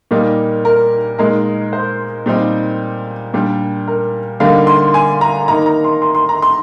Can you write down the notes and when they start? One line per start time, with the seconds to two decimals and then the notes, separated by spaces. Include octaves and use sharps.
0.11 A#2 G3 A#3 D#4
0.65 A#4
1.19 A#2 G#3 D#4 A#4
1.73 C5
2.26 A#2 G3 C4 D#4
3.34 A#2 G3 D4
3.88 A#4
4.40 D3 G3 A#3 D#4 F5
4.67 C6
4.94 G#5
5.21 A#5
5.48 D#3 A#3 D#4 A#5
5.66 A#5
5.84 C6
6.02 C6
6.15 C6
6.29 A#5
6.42 C6